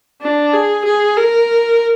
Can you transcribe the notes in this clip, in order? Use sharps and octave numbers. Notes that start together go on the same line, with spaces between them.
D4
G#4
G#4
A#4